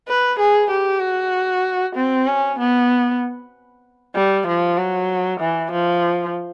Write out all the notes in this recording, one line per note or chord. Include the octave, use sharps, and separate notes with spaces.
B4
G#4
G4
F#4
C4
C#4
B3
G3
F3
F#3
E3
F3